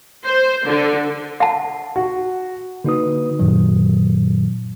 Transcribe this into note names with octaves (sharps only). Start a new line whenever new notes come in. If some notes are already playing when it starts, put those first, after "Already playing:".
C5
D3
F#5 A5
F#4
D3 A#3 D#4 F#4 B4 D#6
F#2 A#2 D#3 F#3